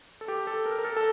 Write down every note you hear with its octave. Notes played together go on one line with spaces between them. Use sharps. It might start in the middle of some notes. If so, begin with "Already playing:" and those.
A4
G4
A4
A#4
A#4
A4
A4